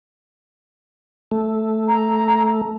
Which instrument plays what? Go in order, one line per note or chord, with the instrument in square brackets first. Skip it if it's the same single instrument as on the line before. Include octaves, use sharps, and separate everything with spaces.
[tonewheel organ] A3
[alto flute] A#5